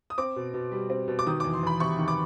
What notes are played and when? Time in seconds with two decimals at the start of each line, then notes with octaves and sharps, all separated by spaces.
0.10 D#6
0.18 C4 D6
0.36 B2
0.54 B2
0.72 G3
0.90 C4
1.08 B2
1.19 D6
1.26 D#3 D#6
1.40 E2 D6
1.53 C6
1.63 E2 B5
1.80 C3 C#6
1.99 D#3
2.08 D6